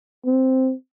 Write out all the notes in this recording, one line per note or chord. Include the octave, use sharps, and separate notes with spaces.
C4